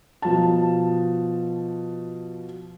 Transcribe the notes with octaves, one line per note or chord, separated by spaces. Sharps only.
B2 F3 A5